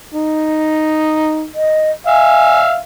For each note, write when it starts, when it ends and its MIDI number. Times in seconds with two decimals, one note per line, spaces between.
0.14 1.47 63
1.54 1.91 75
2.07 2.78 76
2.07 2.78 77
2.07 2.59 80